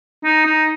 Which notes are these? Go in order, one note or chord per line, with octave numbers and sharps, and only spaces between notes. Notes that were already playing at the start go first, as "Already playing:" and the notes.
D#4
D#4